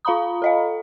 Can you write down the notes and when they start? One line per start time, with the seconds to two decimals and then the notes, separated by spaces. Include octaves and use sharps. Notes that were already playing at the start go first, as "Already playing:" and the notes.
0.05 F4 F5 A#5 B5 D#6
0.42 A4 D#5 F5